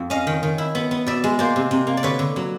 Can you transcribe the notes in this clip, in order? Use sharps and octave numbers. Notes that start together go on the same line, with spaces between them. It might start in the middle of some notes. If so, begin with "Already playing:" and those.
Already playing: F2
C#4 D#5 F5
D#3
D#3
E4
B3
B3
B2 D5 E5
G#3
A#3 C5 D5
C3
C3
A#3
D5
D3 B4 C#5
D3
F#3